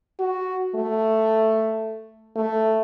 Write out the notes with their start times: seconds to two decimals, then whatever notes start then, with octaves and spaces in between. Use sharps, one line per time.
0.20 F#4
0.75 A3
2.36 A3